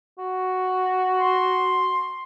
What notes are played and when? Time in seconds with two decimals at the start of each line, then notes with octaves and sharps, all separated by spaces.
0.19 F#4
1.18 C6